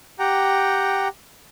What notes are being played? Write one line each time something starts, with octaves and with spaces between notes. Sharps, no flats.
G4 F#5 G5 A#5